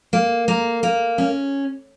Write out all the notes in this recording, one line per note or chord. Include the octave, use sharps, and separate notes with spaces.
A#3
A#3
A#3
C#4